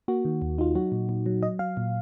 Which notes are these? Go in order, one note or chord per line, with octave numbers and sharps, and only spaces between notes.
A#3 F#4
D#3
D#2
D#4 F4
F#3 F#4
A#2
A#2
F#3
F#3 D#5
F#3 F5
A#2